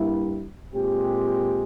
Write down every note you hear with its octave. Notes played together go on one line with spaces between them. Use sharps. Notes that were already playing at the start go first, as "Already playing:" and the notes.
Already playing: G2 G3 A#3 E4
A#2 G#3 C4 G4